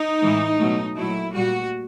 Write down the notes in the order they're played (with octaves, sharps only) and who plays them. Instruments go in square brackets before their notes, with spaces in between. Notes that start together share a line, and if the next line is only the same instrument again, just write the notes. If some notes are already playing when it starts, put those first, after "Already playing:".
Already playing: [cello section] D#4
A2 E3 G#3
B2 F#3 A3
A#2 F#3 A3 E4
A#2 G3 F#4